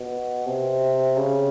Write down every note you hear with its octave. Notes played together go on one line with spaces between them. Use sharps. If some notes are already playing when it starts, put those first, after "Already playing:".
Already playing: B2
C3
C#3